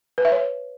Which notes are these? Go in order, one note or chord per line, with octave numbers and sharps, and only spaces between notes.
B4
E5
C#5